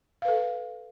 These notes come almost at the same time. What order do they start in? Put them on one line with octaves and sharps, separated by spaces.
F5 B4 A4